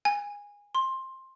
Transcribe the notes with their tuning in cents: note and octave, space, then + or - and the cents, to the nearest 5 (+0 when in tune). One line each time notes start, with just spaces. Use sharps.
G#5 -20
C6 +15